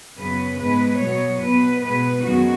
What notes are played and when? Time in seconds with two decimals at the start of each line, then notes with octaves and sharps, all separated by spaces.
0.18 F#2 C#3 B3 B4
0.59 G#2 G#3 B3 B4
1.00 B2 F#3 B3 C#5
1.42 B2 B3 B4
1.82 B2 G#3 B3 B4
2.24 F#2 D#3 G#3 B3 F#4